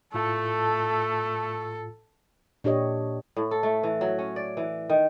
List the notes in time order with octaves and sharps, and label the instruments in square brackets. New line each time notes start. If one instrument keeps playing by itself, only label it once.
[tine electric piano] A2 F4 A5 [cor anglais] A3 [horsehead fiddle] A4
[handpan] A#2 D4 G4 C#5 D#5
[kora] A2
A4
A3
E3
F#3
C#4
D5
E3
D#3